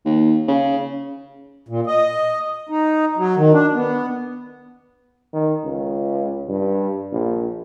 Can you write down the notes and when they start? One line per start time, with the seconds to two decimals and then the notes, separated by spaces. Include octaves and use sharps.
0.06 D#2
0.48 C#3
1.68 A#2
1.87 D#5
2.69 D#4
3.17 F#3
3.36 D#3
3.53 D4
3.74 B3
5.33 D#3
5.65 C#2
6.49 G2
7.12 A#1